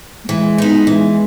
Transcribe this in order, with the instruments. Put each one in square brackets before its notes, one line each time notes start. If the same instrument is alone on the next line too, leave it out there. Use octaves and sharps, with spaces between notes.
[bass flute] A3
[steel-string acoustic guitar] E3 [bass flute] G#3
[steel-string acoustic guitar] B3 D#4
[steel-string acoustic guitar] E3 [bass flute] G#3